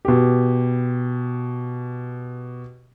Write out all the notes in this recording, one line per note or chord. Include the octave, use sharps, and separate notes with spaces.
B2 G4